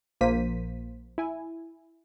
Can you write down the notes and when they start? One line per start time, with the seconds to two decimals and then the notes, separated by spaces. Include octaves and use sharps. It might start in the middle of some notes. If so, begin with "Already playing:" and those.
0.21 A#1 F3 A#3 C5 B6 D#7
1.18 E4 G#5